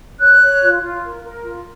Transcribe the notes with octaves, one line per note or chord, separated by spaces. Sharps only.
C#5 F#6
C#5
F4
F4
A#4
A#4
F4